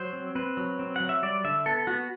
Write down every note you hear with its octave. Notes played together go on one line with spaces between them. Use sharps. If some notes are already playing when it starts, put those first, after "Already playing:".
Already playing: F#3 C5
C4
C4 B4
F#3
C4
F#3 F#5
E5
G3 D5
D3 E5
B3 A4
B3 F#4